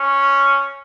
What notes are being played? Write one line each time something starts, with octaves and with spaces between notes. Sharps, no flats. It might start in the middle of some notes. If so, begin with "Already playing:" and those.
Already playing: C#4